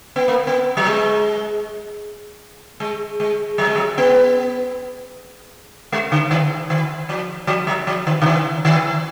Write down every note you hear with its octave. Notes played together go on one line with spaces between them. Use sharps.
B3
A#3
B3
F#3
G#3
G#3
G#3
F#3
G#3
F#3
B3
G#3
D3
D#3
D#3
F3
F3
F#3
F3
D#3
D3
D#3
D#3